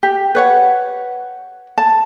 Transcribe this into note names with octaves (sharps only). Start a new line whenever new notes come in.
G4
B4 C#5 F#5
A5